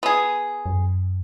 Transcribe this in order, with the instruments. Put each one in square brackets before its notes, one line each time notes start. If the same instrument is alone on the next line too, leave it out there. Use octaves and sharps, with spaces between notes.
[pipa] B3 G#4
[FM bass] F#2